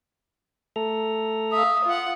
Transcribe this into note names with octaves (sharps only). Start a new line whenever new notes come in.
A3 A4 A#5
E5 F5 D#6
F4 F#5